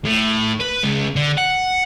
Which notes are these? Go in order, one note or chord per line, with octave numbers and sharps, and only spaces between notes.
A2
B4
C#3 G#3
D3
F#5